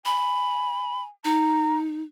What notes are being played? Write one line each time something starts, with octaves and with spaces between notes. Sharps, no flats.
G#5 B5
D#4 A#5